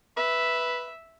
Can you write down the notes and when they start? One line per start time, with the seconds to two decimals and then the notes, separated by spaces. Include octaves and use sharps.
0.17 B4 E5